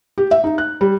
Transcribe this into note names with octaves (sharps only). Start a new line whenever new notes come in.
G4
E5
D#4
F#6
G3